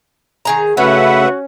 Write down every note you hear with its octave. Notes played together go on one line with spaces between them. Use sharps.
D#3 G#4 A#5
C#3 A3 C#4 F#4 B4 E5 F#5